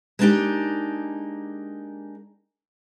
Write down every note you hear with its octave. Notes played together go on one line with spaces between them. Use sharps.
G#3 A#3 B3 D4 D#4 G4